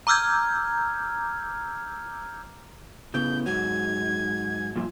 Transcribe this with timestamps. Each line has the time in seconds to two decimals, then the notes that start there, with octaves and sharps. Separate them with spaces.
0.07 A#5 D6 E6 F6 G6 G#6
3.14 A2 C#3 B3 G6
3.46 G#2 F#3 G#6
4.76 G2 A#2 F3